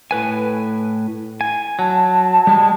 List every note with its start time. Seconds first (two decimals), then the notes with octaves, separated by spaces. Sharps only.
0.11 A2 B4 G#5
1.41 G#5
1.79 F#3 A5
2.47 G3 G#3